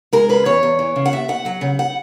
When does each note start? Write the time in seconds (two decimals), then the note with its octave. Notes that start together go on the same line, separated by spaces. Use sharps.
0.13 G#3 A#4
0.29 C#3 B4
0.45 E2 C#5
0.63 E2
0.79 E3
0.96 C#3
1.06 F#5
1.12 D#2 E5
1.28 D#2 F#5
1.45 F#3 F#5
1.61 C#3
1.79 F#5